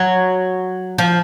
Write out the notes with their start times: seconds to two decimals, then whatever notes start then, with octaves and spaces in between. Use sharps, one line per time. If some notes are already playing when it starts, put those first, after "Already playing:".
Already playing: F#3
0.98 F3